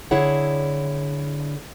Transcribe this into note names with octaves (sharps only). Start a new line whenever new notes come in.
D3 E4 G#4 C#5 F#5